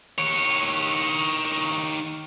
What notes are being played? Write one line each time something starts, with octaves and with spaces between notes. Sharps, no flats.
D#3 C#5